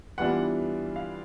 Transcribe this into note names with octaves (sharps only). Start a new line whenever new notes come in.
E3 G3 B3 D4 F4 F#5
F5